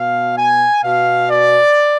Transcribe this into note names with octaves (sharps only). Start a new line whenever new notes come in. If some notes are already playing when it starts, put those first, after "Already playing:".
Already playing: B2 F5
G#5
B2 F5
D5